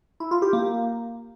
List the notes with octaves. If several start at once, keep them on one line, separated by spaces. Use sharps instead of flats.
E4
F4
G4
A#3